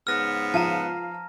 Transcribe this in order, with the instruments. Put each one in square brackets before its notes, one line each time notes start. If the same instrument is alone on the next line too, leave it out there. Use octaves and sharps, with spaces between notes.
[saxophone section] G#2 C#3 B3 [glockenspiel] F6 A#6
[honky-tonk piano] F3 F5 D#7 [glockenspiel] A5 A#5